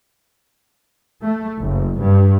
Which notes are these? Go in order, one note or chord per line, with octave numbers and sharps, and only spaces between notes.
A3
F#1
G2